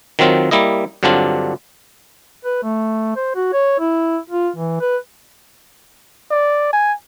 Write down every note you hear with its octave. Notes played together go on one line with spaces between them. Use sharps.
D#3 F#3 C4 F4
G3 A#3 E4 D#5
G2 D3 F#3 C4 D4 F4
B4
A3
C5
F#4
C#5
E4
F4
E3
B4
D5
G#5